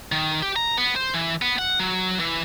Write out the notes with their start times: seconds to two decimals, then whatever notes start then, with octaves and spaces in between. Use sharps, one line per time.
0.12 D#3
0.42 G4
0.56 A#5
0.77 B3
0.96 C5
1.14 E3
1.42 B3
1.58 F#5
1.80 F#3
2.20 E3